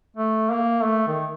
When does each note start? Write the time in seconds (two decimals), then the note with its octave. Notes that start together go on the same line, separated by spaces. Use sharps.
0.17 A3
0.51 A#3
0.84 A3
1.07 D#3